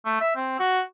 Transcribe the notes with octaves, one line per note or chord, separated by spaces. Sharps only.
A3
E5
C4
F#4